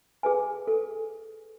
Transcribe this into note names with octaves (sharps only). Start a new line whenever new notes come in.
G#4 B4 G#5
A4